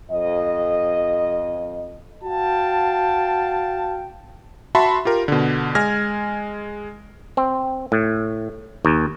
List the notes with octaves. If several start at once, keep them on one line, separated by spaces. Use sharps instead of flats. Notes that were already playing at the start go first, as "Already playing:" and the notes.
F2 D#5
F#4 F5 G5 A5
F#4 E5 A5 B5 C6
F4 G4 A#4
B2 D3
G#3 G#5 F6 G#6 A#6
C4
A2
D#2